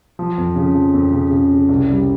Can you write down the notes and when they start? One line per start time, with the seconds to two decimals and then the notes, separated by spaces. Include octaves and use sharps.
0.19 F3
0.38 F2
0.56 C#3
0.75 F3
0.94 F2
1.12 C#3
1.31 C#3
1.51 C#3
1.69 C2
1.89 G3